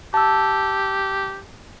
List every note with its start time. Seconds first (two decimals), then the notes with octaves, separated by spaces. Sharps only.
0.14 G4 A5 E6